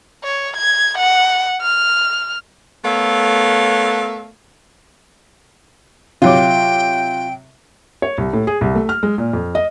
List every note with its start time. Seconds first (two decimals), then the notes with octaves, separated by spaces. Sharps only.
0.24 C#5
0.57 G#6
0.98 F#5
1.61 F6
2.84 A3 B3 A4 A#4 C#5 F5
6.22 C3 F#3 F4 G5 D6
8.02 C#5
8.18 C2
8.33 A2
8.47 G#4
8.61 C2
8.75 A3
8.89 F6
9.03 G#3
9.18 A#2
9.33 F2
9.55 D#5